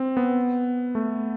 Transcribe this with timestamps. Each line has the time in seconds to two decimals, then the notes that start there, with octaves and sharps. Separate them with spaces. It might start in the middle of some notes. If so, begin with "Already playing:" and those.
Already playing: C4
0.17 B3
0.95 A3